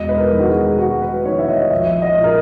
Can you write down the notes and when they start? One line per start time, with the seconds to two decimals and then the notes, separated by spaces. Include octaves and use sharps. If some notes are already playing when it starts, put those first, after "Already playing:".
Already playing: E1 D#5
0.09 B4
0.17 A#4
0.33 E2 D#3
0.40 F#4
0.48 G#4
0.79 E1 F#4
1.02 B4
1.25 E2 D#3 C#5
1.39 E5
1.48 D#5
1.71 A#1 E5
2.02 D#5
2.17 A#2
2.24 A#4